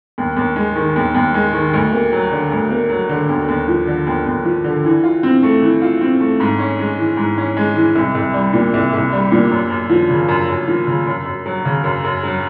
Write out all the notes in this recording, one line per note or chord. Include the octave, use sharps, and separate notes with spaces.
D#2
D#2
G#3
D#3
D#2
D#2
G#3
D#3
D2
A#3
F#3
D3
D2
A#3
F#3
D3
D#2
D#2
F3
D3
D#2
D#2
F3
D3
E3
F4
C4
A3
E3
F4
C4
A3
G#2
C#4
G#3
E3
G#2
C#4
G#3
E3
C2
C2
G3
A#2
C2
C2
G3
A#2
F#2
F#2
F3
C#3
F#2
F#2
F3
C#3
F#2
F#2
F#3
C#3
F#2
F#2
F#3